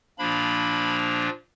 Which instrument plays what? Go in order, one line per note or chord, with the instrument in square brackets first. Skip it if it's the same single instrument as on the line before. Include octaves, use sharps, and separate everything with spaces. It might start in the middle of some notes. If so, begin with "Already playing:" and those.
[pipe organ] A#2 F3 A#3 D4 B5